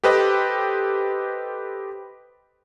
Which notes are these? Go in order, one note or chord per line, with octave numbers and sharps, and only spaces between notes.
G4 A4 B4 C5 D#5 G5